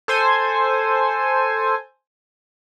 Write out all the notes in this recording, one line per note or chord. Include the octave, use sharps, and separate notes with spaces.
A4 C5 G#5